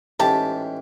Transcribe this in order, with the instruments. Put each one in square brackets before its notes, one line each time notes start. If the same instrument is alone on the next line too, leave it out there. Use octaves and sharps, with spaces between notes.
[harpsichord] A1 G#2 G4 [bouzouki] A5